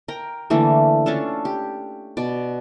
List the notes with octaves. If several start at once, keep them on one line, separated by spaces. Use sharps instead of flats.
A#4 G5 A#5
D3 E3 A3 A#3
C#4 D4 F4 A4
G4
B2 D5